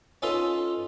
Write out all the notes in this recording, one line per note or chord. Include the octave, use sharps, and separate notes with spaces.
C#4 D#4 F4 A4 B4 C6